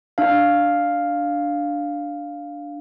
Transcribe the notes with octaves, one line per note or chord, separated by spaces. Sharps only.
D4 F5